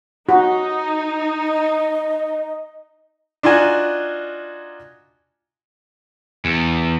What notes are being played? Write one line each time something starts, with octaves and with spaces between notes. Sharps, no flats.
D#4 F#4
D#5
D4 D#4 F4 F#4 G#5
E2